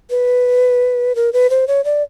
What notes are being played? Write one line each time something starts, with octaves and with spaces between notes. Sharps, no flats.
B4
A#4
B4
C5
C#5
D5